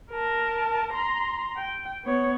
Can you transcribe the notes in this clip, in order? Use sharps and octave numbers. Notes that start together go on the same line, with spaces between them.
A#4 A5
A#5 C6
G5
B3 C#5